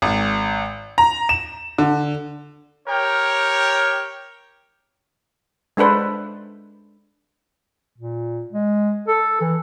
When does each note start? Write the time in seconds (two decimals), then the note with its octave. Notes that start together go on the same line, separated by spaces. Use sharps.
0.02 G#1
0.98 A#5
1.29 E7
1.78 D3
2.88 G4 A#4 C#5 G5
5.77 G#3 D4 A4 B4 C5
7.98 A#2
8.53 G#3
9.08 A4
9.41 E3